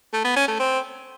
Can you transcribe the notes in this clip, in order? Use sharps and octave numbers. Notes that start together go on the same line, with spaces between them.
A3
B3
C#4
A3
C4